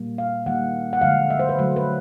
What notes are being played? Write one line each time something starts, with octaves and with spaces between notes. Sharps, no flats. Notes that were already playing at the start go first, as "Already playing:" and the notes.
Already playing: A#2 G3 A#3
F5
D#3 G3 A#3 F#5
F#5
D3 F3 G#3 F5
E5
C5
B4
D3 F#3 A3
B4